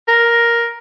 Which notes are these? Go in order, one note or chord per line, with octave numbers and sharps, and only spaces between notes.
A#4